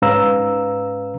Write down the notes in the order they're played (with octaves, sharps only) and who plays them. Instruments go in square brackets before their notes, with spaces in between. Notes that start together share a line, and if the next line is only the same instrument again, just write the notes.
[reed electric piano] G#2 C#4 B4 F5 A#5 E6